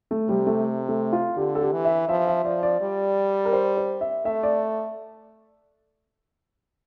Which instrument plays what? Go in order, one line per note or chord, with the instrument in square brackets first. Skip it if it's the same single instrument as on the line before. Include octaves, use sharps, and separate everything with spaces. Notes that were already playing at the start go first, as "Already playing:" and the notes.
[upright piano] A3
[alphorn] C3 [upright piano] G3
[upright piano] A3
A3
F4
[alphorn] D3 [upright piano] G4
[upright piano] A4
G4
[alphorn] E3
[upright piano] E5
[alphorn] F3 [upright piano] E5
[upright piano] E5
[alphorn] F3 [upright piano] D5
[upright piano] D5
[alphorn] G3
[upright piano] A#4
C5
C5
E5
[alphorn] A3 [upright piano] E5
[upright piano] D5